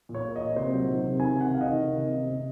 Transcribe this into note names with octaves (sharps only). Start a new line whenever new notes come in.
A#2
C#5
A#3
D#5
A#2
C3 C5
F#3
D#3
C3
D#3 G#5
C3
F#5
C3 F5
D#5
D#3
C3
C3
C3
C3